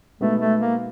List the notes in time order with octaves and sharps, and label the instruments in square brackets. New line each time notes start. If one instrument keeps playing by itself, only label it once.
[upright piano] B2 G#3 B3 D#4 F#4 [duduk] A3
[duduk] A3
A#3